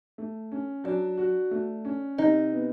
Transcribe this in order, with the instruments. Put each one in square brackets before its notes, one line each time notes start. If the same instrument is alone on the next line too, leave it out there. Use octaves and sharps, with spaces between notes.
[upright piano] A3
C#4
[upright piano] F#3 [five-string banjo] D4
[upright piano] F#4
A3
C#4
[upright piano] C3 [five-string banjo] D#4
[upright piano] B3